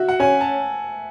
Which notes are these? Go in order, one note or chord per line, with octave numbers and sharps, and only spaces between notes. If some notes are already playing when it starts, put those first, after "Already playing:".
Already playing: F#4 E5
F#5
C#4 G#5
A5